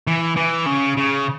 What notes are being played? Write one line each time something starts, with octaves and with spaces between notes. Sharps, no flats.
E3
E3
C#3
C#3